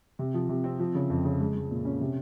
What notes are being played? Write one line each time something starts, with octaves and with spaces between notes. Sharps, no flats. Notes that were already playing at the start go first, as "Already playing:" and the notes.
C3
F3
C3
C4
F3
C#3
F2
C#3
G#3
G#3
A#2
C#4
C3